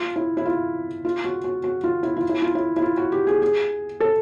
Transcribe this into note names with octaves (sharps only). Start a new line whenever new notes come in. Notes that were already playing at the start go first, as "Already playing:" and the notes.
Already playing: F4
E4
E4
F4
F4
F#4
F#4
F#4
F4
E4
F4
E4
F4
E4
E4
F4
F#4
G4
G#4
G#4
A4